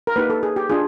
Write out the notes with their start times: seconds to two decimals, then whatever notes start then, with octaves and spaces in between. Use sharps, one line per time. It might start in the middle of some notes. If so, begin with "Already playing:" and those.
0.07 A#4
0.16 A#3 D#4 G4 B4
0.30 A4
0.43 G#4
0.56 G4
0.70 D4 F4 G#4